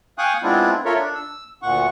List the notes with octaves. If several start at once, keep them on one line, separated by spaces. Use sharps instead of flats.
F5 G5 G#5 C#6 D#6 F#6
G#3 B3 C4 D4 E4 F4
F4 A4 A#4 C#5 E5
D4
E6
D2 A#2 F#5 C#6